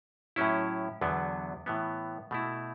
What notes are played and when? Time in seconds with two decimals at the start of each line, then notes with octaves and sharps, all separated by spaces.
0.36 A2 F#3 C#4 E4
1.01 E2 D3 F#3 B3
1.66 A2 E3 B3
2.31 B2 A3 E4